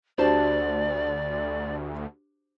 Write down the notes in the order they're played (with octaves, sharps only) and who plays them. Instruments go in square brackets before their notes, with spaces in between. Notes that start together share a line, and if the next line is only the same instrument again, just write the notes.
[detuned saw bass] D2 [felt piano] D4 F#4 G4 [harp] C5 A5 [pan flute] D5